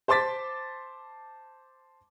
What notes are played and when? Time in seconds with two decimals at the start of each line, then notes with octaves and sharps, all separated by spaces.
0.08 C5 A5 C6 D6 A6 B6